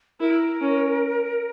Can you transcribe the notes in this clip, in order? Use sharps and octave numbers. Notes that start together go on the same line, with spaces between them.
E4 A#4
C#4